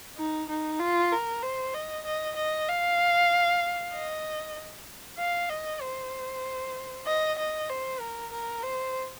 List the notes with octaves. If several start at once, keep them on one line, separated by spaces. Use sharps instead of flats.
D#4
D#4
F4
A#4
C5
D#5
D#5
D#5
F5
D#5
F5
D#5
C5
D#5
D#5
C5
A#4
A#4
C5